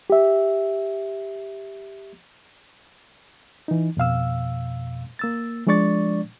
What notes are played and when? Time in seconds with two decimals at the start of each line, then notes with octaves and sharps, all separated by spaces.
0.10 G4 E5
3.68 E3 D#4
3.97 F2 B2 F5 E6
5.19 A#3 E6 A6
5.67 F3 G#3 D4 D5 C#6 A6